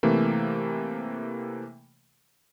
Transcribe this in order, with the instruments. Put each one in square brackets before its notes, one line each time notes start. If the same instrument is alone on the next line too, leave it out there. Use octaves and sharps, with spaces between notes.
[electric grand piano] C3 E3 A3 A#3